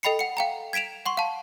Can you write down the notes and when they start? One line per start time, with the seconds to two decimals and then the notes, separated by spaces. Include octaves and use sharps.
0.03 A4 D#5 G5 B5 C7 C#7
0.19 F#5 C#7
0.37 F5 G5 A#5
0.73 G#6 B6 D7 E7 F7
1.06 F#5 C6 C#6
1.17 F5 A5